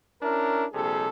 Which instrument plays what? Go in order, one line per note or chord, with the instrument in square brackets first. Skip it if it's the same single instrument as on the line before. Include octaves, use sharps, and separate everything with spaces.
[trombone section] C#4 D4 E4 A#4
A#1 C3 G3 G#4 A4